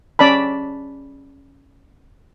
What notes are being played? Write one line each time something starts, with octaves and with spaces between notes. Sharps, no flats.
C#4 D5 A5 B5